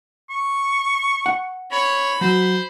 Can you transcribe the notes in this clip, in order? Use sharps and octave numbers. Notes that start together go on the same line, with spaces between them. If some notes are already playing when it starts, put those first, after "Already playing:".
C#6
F#5
C#5 B5
F#3 C5